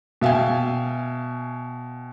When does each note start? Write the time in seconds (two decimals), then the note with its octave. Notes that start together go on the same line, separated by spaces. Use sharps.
0.22 B2 E5 F5 G5 G#5